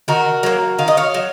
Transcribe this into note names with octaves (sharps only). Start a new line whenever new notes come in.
D#3 F#4 A#4
F#3 A#3
D#3 F5
D#5
C#5 F5
F#3